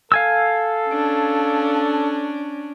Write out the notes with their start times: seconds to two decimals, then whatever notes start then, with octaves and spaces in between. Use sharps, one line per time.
0.12 A4 F5 G#5 E6
0.89 C#4 D4